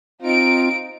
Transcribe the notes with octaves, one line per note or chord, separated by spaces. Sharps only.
C4 D#4 F4 D7